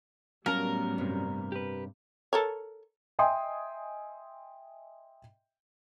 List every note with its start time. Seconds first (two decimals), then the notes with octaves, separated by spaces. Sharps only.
0.46 A2 F#3 G3 B3 C#4 A#4 F5 A5
0.98 G2 C3
1.52 G4 B4
2.33 A4 A#4 C#5
3.19 D#5 E5 G5 G#5 C6 D#6